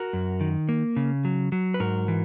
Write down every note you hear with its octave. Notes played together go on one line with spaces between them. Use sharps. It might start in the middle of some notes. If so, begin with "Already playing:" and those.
Already playing: F#4 A#4
F#2
D#3
A#3
C#3
F#3
F#3
B4
G#2 F#4 A#4
E3